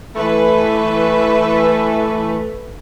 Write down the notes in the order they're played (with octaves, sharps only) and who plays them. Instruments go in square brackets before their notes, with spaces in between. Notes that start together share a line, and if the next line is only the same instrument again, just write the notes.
[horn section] E3 A3 [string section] B4